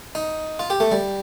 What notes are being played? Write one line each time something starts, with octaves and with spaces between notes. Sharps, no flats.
D#4
F4
G4
A3
G3